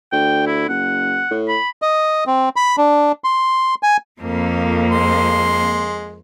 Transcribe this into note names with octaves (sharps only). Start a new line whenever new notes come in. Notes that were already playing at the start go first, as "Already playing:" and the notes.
D2 G5
E4
F#1 F#5
A2
B5
D#5
C4
B5
D4
C6
G#5
F2 A#3
G#3 C6